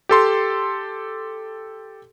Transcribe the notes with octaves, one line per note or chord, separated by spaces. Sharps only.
G4 A4 C6